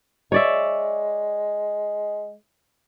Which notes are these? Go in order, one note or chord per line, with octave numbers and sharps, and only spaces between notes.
G#3 C#5 D5 E5